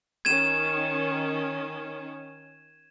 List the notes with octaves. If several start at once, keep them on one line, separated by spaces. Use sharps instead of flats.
D#3 C#4 G#6 D#7 E7